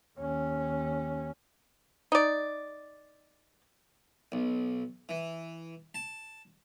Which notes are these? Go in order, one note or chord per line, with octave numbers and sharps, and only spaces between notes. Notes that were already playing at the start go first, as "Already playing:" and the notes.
D#2 C#4
D#4 D5
B1
E3
A5